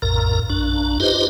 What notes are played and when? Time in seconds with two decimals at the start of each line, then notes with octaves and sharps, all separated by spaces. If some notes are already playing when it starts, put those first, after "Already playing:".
0.02 A#1 F2 A2 A#4 A#5
0.50 A#1 F#2 D4
1.00 D#4 F4 G4 B4 C5 D#5